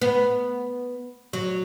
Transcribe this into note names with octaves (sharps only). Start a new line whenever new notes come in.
B3
F#3